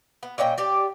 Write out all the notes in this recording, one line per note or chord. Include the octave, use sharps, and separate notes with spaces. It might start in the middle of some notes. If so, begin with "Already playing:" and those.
B3
A#2 C#4 D#5 G5
G4 D5